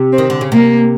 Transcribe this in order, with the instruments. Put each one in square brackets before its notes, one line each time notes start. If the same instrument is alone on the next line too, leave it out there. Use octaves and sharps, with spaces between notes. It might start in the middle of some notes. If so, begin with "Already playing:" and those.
Already playing: [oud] C3
[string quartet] C4
[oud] D#3
D3
C#3
[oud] C3 [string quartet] A#3